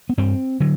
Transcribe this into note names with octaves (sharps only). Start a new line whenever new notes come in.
B3
G2 C4
D3 F#3